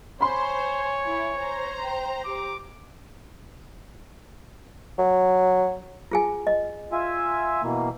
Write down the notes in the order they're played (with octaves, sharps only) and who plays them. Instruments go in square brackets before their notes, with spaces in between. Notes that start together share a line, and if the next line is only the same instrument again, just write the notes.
[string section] C5 [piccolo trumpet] C#5 [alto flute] G#5 [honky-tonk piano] B5 C6
[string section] E4
C5 A#5
[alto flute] G5
[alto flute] G4 [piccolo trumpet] D6
[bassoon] F#3
[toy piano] F4 G#4 G#5
D#5
[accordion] F4 E5 G#5
B2 E3 A#3